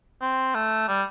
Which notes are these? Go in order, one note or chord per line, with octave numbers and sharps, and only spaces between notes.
C4
A3
G3